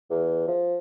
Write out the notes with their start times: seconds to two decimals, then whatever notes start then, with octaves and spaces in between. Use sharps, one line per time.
0.10 E2
0.48 F3